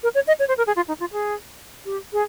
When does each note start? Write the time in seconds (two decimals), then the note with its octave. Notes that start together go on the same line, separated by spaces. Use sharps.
0.03 A#4
0.15 C#5
0.27 D#5
0.39 C#5
0.48 C5
0.57 A#4
0.67 G#4
0.76 F4
0.88 D#4
1.00 F4
1.12 G#4
1.85 G4
2.13 G#4